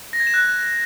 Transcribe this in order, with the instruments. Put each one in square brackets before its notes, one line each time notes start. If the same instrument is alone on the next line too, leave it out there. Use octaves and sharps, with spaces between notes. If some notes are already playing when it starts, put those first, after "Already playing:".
[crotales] A#6
G#6
E7
F#6